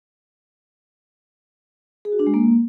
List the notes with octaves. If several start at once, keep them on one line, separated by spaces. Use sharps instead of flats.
G#4
F#4
D4
G#3
A#3